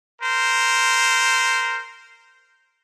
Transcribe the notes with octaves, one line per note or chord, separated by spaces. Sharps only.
A#4 C5